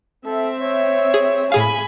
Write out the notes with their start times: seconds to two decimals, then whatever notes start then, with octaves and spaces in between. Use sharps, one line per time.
0.25 C4 A4 E5
0.61 C#5
1.14 G#4
1.52 A2 G#4 F5 G#5 B5